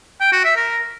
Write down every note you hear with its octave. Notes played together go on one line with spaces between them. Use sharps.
G5
F#4
E5
A#4